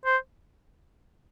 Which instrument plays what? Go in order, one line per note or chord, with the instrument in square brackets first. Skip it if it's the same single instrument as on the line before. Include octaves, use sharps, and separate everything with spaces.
[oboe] C5